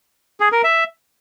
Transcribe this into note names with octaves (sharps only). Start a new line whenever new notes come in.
G#4
A#4
E5